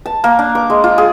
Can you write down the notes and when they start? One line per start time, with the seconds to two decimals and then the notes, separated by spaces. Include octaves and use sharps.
0.06 A5
0.24 A#3
0.39 D4
0.55 D6
0.70 G#3
0.84 F4
0.98 G#4